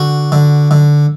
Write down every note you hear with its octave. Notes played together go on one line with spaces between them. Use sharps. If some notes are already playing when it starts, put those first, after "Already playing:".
Already playing: D3 F#4
D3
D3